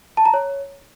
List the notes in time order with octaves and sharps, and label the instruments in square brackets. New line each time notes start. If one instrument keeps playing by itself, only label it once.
[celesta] A5
A#5
C#5